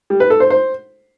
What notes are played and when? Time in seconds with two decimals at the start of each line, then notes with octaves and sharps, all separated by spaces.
0.10 G3
0.20 B4
0.30 A4
0.40 C5
0.50 C5